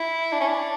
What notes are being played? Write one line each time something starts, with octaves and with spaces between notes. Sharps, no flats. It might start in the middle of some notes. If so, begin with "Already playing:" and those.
Already playing: E4
D4
C#4
D4